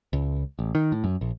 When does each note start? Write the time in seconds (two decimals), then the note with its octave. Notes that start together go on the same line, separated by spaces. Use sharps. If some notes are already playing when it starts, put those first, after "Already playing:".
0.13 C#2
0.59 A1
0.75 D#3
0.92 A2
1.04 F#2
1.21 A#1